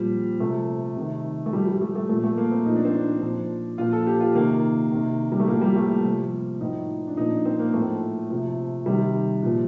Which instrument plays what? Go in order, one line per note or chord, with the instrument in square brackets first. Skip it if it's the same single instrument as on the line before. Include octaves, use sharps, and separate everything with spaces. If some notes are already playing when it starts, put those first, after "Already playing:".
Already playing: [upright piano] A#2 F3 G3
C3 F3 A3
C3 D#3
A3
A2 F3 G3
G3
A3
A3
A#2 F3 A3
A3
A#3
C4
A#2 F3 D#4
D4
C4
D4
A#2 F3
A#2 F3 F4
A4
G4
F4
C3 D#3 A#3
C3 D#3
G3
A3
A2 F3 A#3
G3
A3
C3 F3
A2 F3 D#4
D4
A#2 F3 D#4
D4
C4
A#3
A2 F3 A3
C3 F3
C3 D#3 G3
A#2 F3